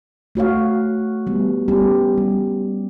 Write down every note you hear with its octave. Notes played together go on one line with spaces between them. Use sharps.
A3 F#4 C#5 F5
G3 B3
G3 B3 C#4 G4
G3